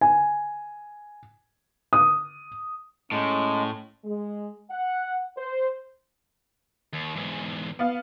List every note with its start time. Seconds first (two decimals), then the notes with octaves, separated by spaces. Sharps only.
0.01 G#5
1.93 D#6
3.12 A2 G#3 C#4
4.05 G#3
4.71 F#5
5.37 C5
6.93 D#2
7.16 E2 G#2
7.79 B3 F5